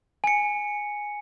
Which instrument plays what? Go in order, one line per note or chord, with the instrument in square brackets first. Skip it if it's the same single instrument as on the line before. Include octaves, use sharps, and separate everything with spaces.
[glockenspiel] G#5 C#7